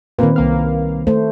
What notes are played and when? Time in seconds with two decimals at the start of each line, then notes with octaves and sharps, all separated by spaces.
0.19 A#2 D#3 A#3 C4 B4
0.36 C2 A#3 F5
1.07 A3 C5